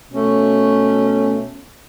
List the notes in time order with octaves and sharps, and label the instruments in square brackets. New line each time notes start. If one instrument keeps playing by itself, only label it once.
[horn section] B2 A3 C#4